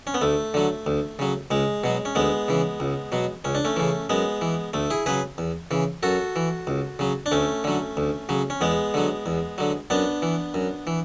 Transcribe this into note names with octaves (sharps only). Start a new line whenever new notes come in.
C#4
B3
D2 A3
D3 F#3
D2
C#3 F#3
C#2 G#3
B2 F#3
C#4
D2 G#3 B3
C#3 E3
C#2
B2 F#3
C#2 C#4
D4
A3 C#4
C#3 E3
F#2 G#3 B3
E3
D2 A3
E4 G#4
C#3 F#3 G#4 B4
E2
C#3 E3
F#2 F#4 A4
E3
C#2
C#3 F#3
D4
D2 A3 C#4
D3 F#3
D2
C#3 F#3
C#4
E2 G#3 B3
D3 F#3
E2
D3 F#3
F#2 B3 D4
E3
F#2
E3